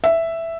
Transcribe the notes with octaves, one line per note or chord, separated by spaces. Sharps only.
E5